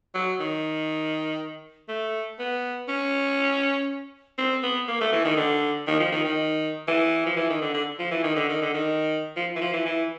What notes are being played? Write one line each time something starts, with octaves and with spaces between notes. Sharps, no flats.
F#3
D#3
A3
B3
C#4
C4
B3
A#3
A3
E3
D#3
D3
D#3
F3
D#3
D#3
E3
F3
E3
D#3
D3
D3
F3
E3
D#3
D3
D#3
D3
D#3
F3
E3
F3
E3
E3